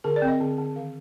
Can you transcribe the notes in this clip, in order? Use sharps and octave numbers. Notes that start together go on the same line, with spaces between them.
D3 A#4
D5
C4
D#5
D3
D3
D#3 F5